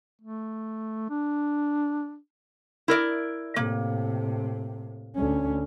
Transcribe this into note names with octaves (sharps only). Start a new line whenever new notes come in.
A3
D4
E4 A#4 D5
A2 C3 A#3
D2 C#4